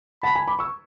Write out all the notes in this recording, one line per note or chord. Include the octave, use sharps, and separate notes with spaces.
F#5 A5 B5
G#5 B5
B5 D6
C#6 E6